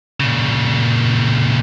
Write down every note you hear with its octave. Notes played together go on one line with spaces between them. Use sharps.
A#2 C#3